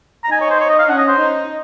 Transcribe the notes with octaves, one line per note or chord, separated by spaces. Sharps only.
A#5
D#4 G#5
C#5
C5
C#5
D#5
F5
C#4 F#5
D#5
C5
D#4